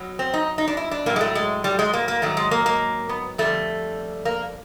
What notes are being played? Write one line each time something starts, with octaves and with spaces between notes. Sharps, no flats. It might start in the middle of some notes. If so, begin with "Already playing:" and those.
Already playing: B2 F#3
C4
D#4
D#4
D4
E4
D4
A2 F#3 A#3
G#3
A3
G#3
G3
G#3
A#3
A#3
G#2 D#3 F#3 A3
G#3
A#3
A#3
B3
F2 D3 G3 A3
A#3